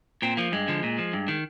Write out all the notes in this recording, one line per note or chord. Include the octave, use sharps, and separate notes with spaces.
A#2 C4
F3 A#3
G2 G#3
D3 F3
A#2
F3
G2
D#3